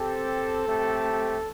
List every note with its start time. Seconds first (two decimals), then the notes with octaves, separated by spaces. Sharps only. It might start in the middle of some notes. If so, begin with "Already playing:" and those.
Already playing: C4 G4 A4
0.67 A3 C4 G4